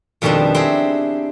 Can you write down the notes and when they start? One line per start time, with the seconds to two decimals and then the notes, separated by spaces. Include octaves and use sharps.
0.22 F2 B2 D#3 G3 C4 D4
0.55 C4 D4 E4 G4 G#4